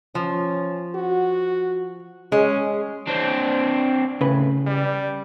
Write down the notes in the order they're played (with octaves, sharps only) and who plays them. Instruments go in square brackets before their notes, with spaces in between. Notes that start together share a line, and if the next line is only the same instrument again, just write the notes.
[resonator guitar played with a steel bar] F3 [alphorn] C#4
[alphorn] F#4
[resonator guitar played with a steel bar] G#3 [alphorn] C#4
[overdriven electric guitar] C4 D4
[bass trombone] A2 [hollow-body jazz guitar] C#3 B4
[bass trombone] G3